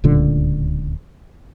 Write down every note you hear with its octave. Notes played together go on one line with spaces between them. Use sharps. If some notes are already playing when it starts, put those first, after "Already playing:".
D1 C#2 A#2 D3